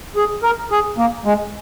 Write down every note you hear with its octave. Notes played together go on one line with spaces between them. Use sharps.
G#4
A#4
G#4
A#3
G#3